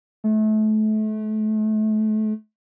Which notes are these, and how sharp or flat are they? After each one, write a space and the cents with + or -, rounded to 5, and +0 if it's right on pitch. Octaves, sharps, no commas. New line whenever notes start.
A3 -30